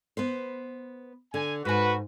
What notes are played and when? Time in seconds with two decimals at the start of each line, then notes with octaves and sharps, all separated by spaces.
0.17 B3 B4 C5
1.34 D3 G#5
1.65 G#2 F#4 B4 G#5